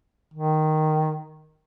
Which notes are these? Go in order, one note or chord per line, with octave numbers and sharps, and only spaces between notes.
D#3